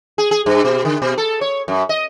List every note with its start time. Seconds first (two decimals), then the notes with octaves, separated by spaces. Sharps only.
0.18 G#4
0.31 G#4
0.46 G2
0.65 B2
0.85 D3
1.02 B2
1.18 A4
1.41 C#5
1.68 F#2
1.89 D#5